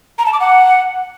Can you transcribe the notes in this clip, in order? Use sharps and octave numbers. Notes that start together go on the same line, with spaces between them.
A#5
A5
D6
F#5